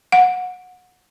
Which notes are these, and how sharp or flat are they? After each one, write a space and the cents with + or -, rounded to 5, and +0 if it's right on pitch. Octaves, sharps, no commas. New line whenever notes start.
F#5 -20